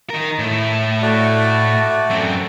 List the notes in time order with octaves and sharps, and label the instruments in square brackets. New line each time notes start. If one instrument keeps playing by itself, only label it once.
[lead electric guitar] D#3 A#4
A2 E4
[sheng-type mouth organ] A3 F#4 D5
[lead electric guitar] F#2 C4